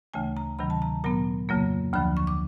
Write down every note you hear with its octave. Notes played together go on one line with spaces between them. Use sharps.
D2 C#3 E3 A3 G#5
A#5
D2 C3 D#3 F#3 B5
A5
A#5
A#2 F#3 B3 A#5
F2 C#3 F#3 A#3
D2 D3 F3 B5
C#6
D6